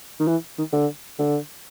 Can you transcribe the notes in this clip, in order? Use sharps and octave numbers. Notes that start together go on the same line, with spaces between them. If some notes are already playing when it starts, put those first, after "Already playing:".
D#3
E3
D#3
D3
D3